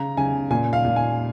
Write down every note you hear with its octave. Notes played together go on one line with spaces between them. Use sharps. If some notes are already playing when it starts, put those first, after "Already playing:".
Already playing: C#3 A#5
C#3 G#5
A#2 G#5
F5
A#2
G#5